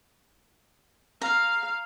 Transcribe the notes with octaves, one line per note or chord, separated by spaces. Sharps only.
F5 A#5